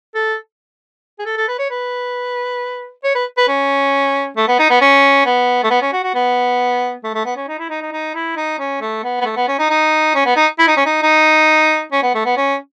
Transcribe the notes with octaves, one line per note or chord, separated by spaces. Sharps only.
A4
G#4
A4
A4
B4
C#5
B4
C#5
B4
B4
C#4
A3
B3
D#4
B3
C#4
B3
A3
B3
C#4
F#4
F#4
B3
A3
A3
B3
C#4
D#4
E4
D#4
D#4
D#4
E4
D#4
C#4
A3
B3
B3
A3
B3
C#4
D#4
D#4
C#4
B3
D#4
E4
D#4
C#4
D#4
D#4
C#4
B3
A3
B3
C#4